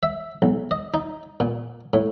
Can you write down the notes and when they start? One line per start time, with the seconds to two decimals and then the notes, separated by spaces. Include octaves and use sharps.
0.03 E5
0.42 B1
0.71 D#5
0.94 D#4
1.40 A#2
1.93 A2